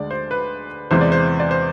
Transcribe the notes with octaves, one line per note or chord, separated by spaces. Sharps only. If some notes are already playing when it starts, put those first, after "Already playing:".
Already playing: D2 D3 G#3 D5
C5
B4
E2 C3 E3 G#3 C5
D5
C5
D5
C5